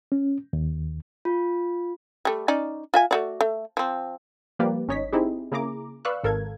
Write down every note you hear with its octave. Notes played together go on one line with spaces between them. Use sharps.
C#4
D#2
F4
G3 A3
C#4 D#4 D5
F4 E5 G#5
A3 F#4 D5
A3
F3 C4
F3 G3 A#3 G4 B4 D5
G#1 C#4 D#4 C#5 D#5 B6
C4 D#4 E4 G4 G#4
C#3 A#3 E4 G#4 A#5 D6
B4 D5 F5 C#6 E6 F#6
G#1 A4 A#4 F5 G#6